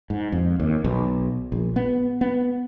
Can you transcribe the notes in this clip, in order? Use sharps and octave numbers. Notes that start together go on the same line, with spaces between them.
G#2
F2
D#2
B1
A#1
B3
B3